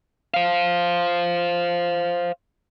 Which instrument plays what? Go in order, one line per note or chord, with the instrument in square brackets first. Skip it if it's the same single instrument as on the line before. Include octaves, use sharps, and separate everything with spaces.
[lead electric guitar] C5 F5